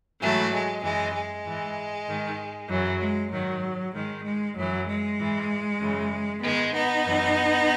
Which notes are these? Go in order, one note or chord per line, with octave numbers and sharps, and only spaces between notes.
G#2 E3 F#3 A3
G#3
F#2 E3 G#3
G#3
G#2 E3
G#2 D#3
F#2 E3 F#3
G#3
G#2 D#3 F#3
G#2 D#3 G#3
G#3
F#2 E3 F#3
G#3
G#2 E3
F#2 C#3 E3
G#2 D#3 G#3 B3
B3 D#4
F#2 E3